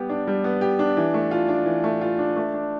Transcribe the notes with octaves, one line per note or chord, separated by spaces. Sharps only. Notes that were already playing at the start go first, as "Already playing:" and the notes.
Already playing: G3 B3 G4
D4
G3
B3
G4
D4
E3
A3
F4
D4
E3
A3
F4
D4
A3
D4